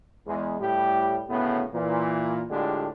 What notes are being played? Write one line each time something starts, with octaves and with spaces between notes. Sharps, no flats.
E2 G#3
A2 G3 G4
D2 A2 C#3 B3
A#2 E3
A2 D3 G#3 D4 F4 G4